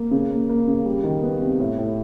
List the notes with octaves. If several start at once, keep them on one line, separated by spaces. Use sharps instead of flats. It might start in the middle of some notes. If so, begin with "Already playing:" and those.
Already playing: A#3
C#3
A#3
A#3
C#3
G3
D#3
B3
C3
A2
A2